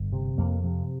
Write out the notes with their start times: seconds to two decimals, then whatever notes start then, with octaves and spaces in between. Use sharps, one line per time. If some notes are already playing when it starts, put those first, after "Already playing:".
Already playing: G1
0.12 C3
0.38 F2 A#3
0.64 C3 F3